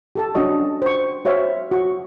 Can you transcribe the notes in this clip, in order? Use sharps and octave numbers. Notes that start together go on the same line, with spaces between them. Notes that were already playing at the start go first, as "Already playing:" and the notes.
G4 A4 A5
C#4 D4 F#4 D#5 C#6
C5 C#6
F#4 C5 C#5 E5 F5
F#4 C#6